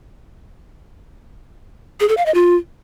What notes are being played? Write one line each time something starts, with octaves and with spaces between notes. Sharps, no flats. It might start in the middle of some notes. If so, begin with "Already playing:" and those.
G#4
A4
F5
D#5
F4